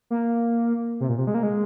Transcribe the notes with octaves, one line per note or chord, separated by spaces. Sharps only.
A#3
C3
A#2
C3
G#3
A#3
G#3